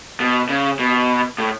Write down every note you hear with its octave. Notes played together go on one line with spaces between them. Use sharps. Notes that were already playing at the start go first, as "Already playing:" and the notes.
B2
C#3
B2
A2